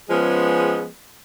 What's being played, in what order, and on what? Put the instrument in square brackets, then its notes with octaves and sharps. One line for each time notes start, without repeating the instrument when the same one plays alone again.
[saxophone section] F3 G#3 B3 C#4 G#4